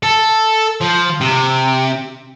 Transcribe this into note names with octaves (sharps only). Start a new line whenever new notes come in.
A4
F3
C3